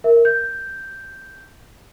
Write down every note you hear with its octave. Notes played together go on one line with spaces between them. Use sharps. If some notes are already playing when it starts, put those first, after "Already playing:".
A#4 E5
G6